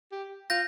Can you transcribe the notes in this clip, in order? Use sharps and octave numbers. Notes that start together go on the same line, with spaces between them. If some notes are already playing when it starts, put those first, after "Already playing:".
G4
F4 G6 A#6